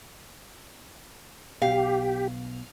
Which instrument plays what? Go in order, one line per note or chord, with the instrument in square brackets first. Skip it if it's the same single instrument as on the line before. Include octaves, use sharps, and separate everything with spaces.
[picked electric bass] B1 B2 [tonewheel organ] G4 [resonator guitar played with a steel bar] F5